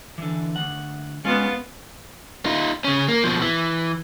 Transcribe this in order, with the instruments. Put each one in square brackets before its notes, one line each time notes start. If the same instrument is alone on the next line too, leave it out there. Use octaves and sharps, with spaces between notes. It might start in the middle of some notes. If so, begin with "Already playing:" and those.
[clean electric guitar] D3 E3
D2 F#5
[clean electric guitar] G#3 C#4 G#4 [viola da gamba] B3 F4
[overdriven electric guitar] D#4 F4
C#3 C#4
A#3
B2 F3
E3